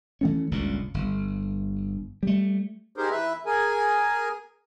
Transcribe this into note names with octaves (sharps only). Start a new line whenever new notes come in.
E3 A3 C#4
G1 C#2 A#2
G1
G3 A3
D#4 G4 G#4 A#4 C5
E3 B4 E5
G#4 A#4 G#5